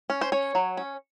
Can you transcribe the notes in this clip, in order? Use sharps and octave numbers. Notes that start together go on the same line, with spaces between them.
C#4
C5
C#4 C#5
F#3
C#4